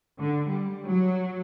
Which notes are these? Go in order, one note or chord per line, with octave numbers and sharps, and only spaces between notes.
D3
G3
F#3